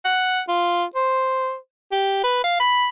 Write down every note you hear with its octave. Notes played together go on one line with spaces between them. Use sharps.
F#5
F4
C5
G4
B4
F5
B5